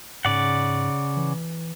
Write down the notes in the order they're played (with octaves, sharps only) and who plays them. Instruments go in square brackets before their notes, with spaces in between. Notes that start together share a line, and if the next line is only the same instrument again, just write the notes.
[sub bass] G#2 [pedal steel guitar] C#3 D5 F#5
[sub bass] E3